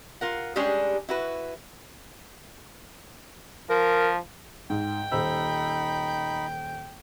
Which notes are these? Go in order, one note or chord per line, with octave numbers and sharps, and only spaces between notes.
F4 A#4 F#5
G3 G#3 C#4 D4 G4 G#4
E4 F#4 B4
F3 A#4
G#2 G5
D#1 D#4 C5 B5 E6